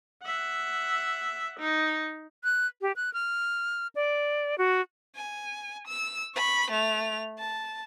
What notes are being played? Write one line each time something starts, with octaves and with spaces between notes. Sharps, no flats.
E5 F#5
D#4
F#6
G4
F#6
F6
D5
F#4
G#5
E6
B5 C#6
A3 F7
A5